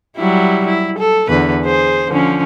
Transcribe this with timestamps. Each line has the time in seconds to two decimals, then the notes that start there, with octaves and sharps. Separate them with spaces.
0.16 F#3 G3 E4
0.67 E4
0.98 A4
1.29 E2 D3 B4
1.64 G#4 C5
2.09 D3 F3 C#4